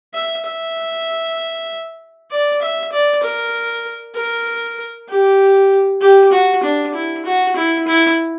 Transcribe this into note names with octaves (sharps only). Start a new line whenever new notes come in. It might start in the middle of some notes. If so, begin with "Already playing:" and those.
E5
E5
D5
E5
D5
A#4
A#4
G4
G4
F#4
D4
E4
F#4
E4
E4